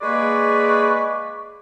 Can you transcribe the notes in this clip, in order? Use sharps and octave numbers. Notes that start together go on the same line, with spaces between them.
G#3 A#3 G#4 B4 D5 C#6